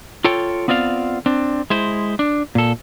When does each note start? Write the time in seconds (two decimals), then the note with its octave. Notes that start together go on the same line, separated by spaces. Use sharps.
0.24 F4 A4 C#5 G5
0.68 B3 C4 F4 D5 F5
1.26 C4 D4
1.70 G#3 E4 C5
2.19 D4
2.55 A#2 A4